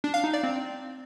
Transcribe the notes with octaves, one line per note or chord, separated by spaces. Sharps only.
D4
F5
D#4
D5
C4